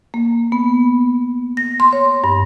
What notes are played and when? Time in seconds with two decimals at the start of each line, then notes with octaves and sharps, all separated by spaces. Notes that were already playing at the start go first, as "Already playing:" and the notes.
0.14 A#3
0.52 B3
1.57 A#6
1.80 C6
1.93 C#5
2.24 G2